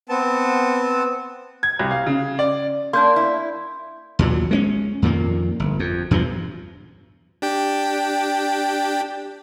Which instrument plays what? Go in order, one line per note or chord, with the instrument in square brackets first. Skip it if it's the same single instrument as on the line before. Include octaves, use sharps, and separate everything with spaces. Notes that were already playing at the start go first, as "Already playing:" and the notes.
[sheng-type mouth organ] B3 C4 A5
[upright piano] G#6
C2
F5
C#3
D5
[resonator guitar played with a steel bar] A#3 D4 [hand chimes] C6 G6
[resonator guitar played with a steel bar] E4
[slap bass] D#2 A#2 F#3
G#3 A#3 C#4
F2 A#2 D#3 A#3
G1
F2
E2 G2 B2 F3
[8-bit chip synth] D4 G4 G5